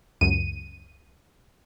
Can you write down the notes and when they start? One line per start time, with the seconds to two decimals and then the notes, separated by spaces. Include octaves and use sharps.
0.21 C#2 F#2 D#7